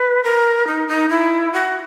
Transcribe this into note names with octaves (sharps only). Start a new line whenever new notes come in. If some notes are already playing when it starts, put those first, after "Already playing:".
Already playing: B4
A#4
D#4
D#4
E4
F#4